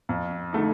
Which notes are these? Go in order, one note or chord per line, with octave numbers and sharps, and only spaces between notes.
F2
D3 A3 D#4